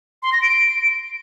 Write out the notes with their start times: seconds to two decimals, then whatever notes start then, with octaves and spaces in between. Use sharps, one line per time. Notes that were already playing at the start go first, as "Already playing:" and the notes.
0.23 C6
0.32 A#6
0.42 D7